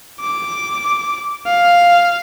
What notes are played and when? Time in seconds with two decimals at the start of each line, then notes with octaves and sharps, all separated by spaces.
0.21 D6
1.46 F5